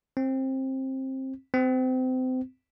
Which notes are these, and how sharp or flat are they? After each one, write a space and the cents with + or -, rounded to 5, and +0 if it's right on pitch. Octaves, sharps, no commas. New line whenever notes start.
C4 +20
C4 -30